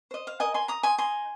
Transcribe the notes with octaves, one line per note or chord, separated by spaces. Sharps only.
C5 D#5
F5
A#4 D#5 G#5
G#5 C6
D#5 A#5 D#6
G#5 C6
D#4 G#5 C6